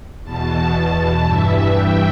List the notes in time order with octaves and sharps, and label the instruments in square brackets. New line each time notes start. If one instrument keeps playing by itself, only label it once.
[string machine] E2 B2 A5
G2 E3 E5
G5